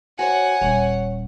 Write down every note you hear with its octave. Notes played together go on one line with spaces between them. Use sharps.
F#4 C5 C#5 F#5 G#5
D#1 C#5